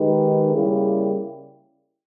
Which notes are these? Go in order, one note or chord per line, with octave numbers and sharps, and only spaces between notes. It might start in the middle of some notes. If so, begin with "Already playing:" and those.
Already playing: D#3 G#3 D#4 G4 B4
C#3 G3 A#3 E4 G4